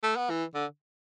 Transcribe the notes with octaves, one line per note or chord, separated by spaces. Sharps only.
A3
B3
E3
D3